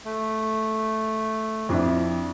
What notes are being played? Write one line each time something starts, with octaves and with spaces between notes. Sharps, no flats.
A3
F2 D4 E4